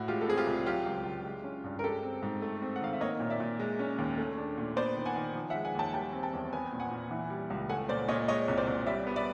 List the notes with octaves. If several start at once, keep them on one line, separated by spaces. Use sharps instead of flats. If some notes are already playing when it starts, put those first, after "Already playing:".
Already playing: A2 F#4
G#3 F4 G4
A4
C4 G#4
F4 G4
C2
F#3 F4 G4
C#2
C#2
G#3
C#4
G2
A#4
G#3 G4 A4
C4
G#2
A3
C4
F#5
D#3 F5
E5
A#3 C#5 D#5
A#2
D5 E5
A#2
G#3
C#4
D#2
A3
D4
A#2
B3 C5 D5
D#3
F#5 G#5
D#3
F3
E5 F#5
G#3
F#5 G#5
D#2 G5 A5
G3 G5 A5
C4
G5 A5
E2
B3 G#5
G5
A#2
F#5 G#5
A#2
E3
G3
C#2
A3 F#5 G#5
A#2 C5 D5
A#2 C#5 D#5
G#3 C#5 D#5
C2 C#5
C5 D5
C2
G3 D5 E5
B3
D5 E5